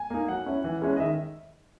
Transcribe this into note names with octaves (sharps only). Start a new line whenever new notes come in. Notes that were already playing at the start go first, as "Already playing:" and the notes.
Already playing: G#5
A#3 D#4
F#3 F#5
C#4 E4
E3
G#3 C#4 E4
D#5
D#3 E5